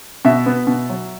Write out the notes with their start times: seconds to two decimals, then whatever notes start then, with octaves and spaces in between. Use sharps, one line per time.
0.25 B2 E5
0.46 B3
0.67 B2
0.89 F#3